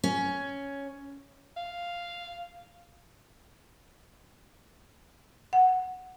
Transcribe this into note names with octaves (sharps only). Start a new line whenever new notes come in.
C#4
F5
F#5